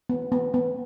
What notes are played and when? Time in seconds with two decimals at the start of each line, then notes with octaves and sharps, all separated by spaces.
0.09 B3
0.32 B3
0.54 B3